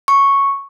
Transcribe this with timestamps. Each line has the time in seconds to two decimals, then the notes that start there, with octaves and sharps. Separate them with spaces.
0.08 C#6